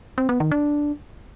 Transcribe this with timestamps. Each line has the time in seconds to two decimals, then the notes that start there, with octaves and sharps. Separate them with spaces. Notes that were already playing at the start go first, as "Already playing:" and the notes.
0.18 C4
0.29 B3
0.40 D#3
0.51 D4